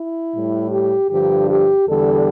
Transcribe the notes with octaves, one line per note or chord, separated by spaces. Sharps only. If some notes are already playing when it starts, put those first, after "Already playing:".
Already playing: E4
A2 G3
G4
G2 D3 F3 G4
G4
E2 D3 G3 A4